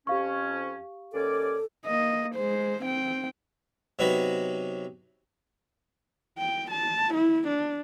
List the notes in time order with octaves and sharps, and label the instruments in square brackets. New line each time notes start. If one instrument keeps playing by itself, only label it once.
[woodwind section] F2 C#4 [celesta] G4 F5 C#6
[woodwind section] D#2 C#4 D5 [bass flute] A4
[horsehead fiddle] A#3 D#5
G#3 C5
C4 G5
[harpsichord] C3 F#3 B3 D#4 F#4 B4
[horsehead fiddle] G5
A5
E4
D4